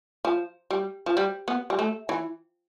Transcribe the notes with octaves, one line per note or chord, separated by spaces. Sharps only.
F3
G3
F3
G3
B3
G3
A3
E3